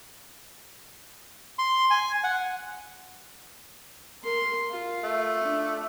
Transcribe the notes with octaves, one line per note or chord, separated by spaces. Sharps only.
C6
G#5
F#5
A#4 C6
F4
A3
D4